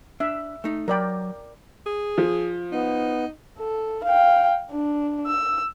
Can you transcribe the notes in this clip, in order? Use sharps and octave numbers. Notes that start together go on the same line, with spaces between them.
D4 E5
A3 D#4
F#3 A#4 D5 G5 B5
G#4
F3
B3 D#4
A4
F5 G5
D4
E6